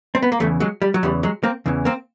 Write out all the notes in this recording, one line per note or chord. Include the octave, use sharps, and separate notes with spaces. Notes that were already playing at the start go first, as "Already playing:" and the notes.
C4
B3
A#3
E2 C#3 E3 G3 A3
F#3 G#3
G3
F#3
E2 C#3 E3 G3
F#3 G#3
A#3 C4
E2 C#3 E3
A#3 C4